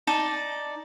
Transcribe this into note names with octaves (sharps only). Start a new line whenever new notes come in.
D#4 D5 A5